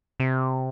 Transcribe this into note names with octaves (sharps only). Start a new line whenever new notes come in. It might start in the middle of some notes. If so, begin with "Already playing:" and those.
C3